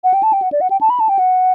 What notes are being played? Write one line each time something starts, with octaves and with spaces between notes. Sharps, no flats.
F#5
G5
A5
G5
F#5
D5
F#5
G5
A5
B5
A5
G5
F#5